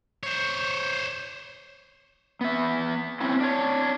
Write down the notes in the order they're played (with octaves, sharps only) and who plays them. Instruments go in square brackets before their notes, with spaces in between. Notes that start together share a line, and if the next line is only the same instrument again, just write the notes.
[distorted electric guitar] C5 C#5
[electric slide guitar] B3 E5
C4 C#4 E4
D4 C#5